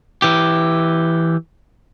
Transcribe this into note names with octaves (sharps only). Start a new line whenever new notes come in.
E3 G4